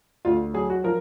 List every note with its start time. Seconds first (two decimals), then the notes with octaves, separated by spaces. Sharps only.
0.25 D2 F4
0.54 F#3 G#4
0.70 F#4
0.84 F3 A#4